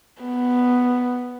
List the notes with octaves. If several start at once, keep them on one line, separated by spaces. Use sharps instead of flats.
B3